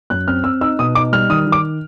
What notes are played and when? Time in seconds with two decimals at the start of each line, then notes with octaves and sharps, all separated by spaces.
0.10 F#2 F#6
0.27 C4 F6
0.44 C4 E6
0.61 D#4 E6
0.79 B2 D#6
0.95 D#4 D6
1.12 G3 F6
1.30 D#3 D#6
1.47 D#3
1.52 D6